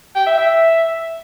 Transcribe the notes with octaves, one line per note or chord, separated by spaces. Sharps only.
G5
E5
E5